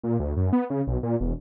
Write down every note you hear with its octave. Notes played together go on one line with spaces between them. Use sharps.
A#2
D2
F#2
B3
C#3
B1
A#2
E1